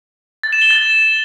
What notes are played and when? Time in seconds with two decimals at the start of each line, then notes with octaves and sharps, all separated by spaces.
0.43 A6
0.53 E7
0.62 G7
0.71 A6